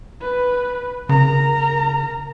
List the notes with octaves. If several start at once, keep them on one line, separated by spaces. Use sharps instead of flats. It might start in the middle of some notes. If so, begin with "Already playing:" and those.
B4
C#3 A#4 A#5